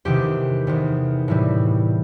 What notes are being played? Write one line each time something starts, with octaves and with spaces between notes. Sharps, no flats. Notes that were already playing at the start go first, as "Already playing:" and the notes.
E2 C3 D#3 G4
E2 C3 D#3
A2 E3 G3